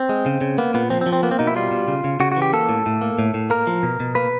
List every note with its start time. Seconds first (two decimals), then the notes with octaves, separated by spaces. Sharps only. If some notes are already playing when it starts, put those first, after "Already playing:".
Already playing: C4
0.09 G#3
0.26 C#3
0.41 C#3
0.58 A#3 B3
0.74 A#2 B3
0.90 F3 C4
1.01 C4
1.06 F3
1.13 C4
1.23 A#3 B3
1.31 C4
1.39 B2 D#4
1.47 E4
1.56 G3 F4
1.71 B2
1.88 C#3
2.04 C#3
2.20 C#3 F#4
2.32 F#4
2.37 E3
2.42 G4
2.53 A#3 A4
2.69 A2
2.86 A2
3.02 A#3
3.19 A2
3.34 A2
3.50 A#3 A#4
3.67 F3
3.83 B2
4.00 B2
4.15 A#3 B4